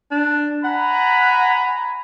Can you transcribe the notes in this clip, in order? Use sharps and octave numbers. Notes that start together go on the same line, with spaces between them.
D4
F#5 G#5 A#5 B5